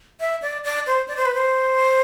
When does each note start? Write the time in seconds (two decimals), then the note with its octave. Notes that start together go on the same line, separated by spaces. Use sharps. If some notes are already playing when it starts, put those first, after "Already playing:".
0.20 E5
0.42 D5
0.64 D5
0.86 C5
1.08 D5
1.17 C5
1.25 B4
1.35 C5